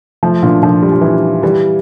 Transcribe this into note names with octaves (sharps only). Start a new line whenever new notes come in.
F3 A3
A#2 D3
D3 F3
G3
F3
E3 G3
E3 G3